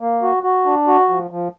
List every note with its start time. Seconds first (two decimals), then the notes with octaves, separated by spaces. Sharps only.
0.01 A#3
0.22 F#4
0.43 F#4
0.66 D4
0.87 F#4
1.09 F3
1.31 F3